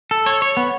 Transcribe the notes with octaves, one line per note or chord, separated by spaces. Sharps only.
A4
C#5
C#5
B3